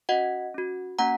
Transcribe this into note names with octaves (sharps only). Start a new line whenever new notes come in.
C#4 F#4 D#5 F#5
C#4 F#4
A#3 C#4 F#4 F#5 A#5